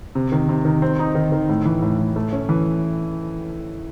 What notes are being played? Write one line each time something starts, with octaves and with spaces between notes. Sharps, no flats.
C3
D#3
C3
D#3
C4
D#4
D#3
D#3
A2
E3
A2
A2
A3
C#4
E3